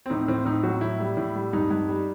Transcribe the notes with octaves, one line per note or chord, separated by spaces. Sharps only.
C4
A2 D#4
A2 C4
A2 D#4
F#3 F#4
A2 E4
G3
A2
G3
G2 D#4
G2
G3